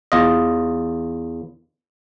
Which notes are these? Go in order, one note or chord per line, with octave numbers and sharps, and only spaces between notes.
E2 F4 D#5